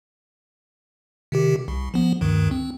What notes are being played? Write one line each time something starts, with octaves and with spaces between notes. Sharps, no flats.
C3 D#3 G4
C2
F3 B3
D2 G2 D#3
C4